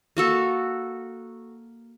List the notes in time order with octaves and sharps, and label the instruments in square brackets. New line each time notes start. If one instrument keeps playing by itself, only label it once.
[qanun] A#3 F#4 A4